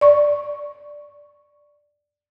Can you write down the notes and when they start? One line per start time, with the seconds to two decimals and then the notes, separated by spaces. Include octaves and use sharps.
0.01 D5 C#6